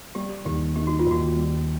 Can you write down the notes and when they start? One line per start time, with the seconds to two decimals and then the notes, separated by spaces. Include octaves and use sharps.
0.15 G3 G4
0.45 D#2 G4
0.76 D#3 G4
0.87 F#4
0.99 F4
1.07 D#2 F#4
1.36 G3